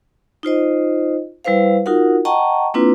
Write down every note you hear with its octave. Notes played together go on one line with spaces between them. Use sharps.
D#4 F4 C5 D#5
G3 E4 B4 C5 F5
D#4 F4 F#4 A#4 F#5
D#5 F#5 G5 A5 A#5 C#6
A#3 C4 D4 E4 F4 B4